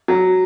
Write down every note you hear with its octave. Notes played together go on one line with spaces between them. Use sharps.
F#3